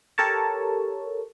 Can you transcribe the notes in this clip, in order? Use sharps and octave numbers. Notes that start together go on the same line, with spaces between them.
G4 A4 A#4 C#5 A5